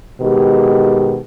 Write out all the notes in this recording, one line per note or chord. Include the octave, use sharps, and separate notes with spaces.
B2 D#3 G#3 G4